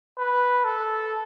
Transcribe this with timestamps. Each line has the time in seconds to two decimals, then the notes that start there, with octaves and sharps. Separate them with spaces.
0.17 B4
0.64 A4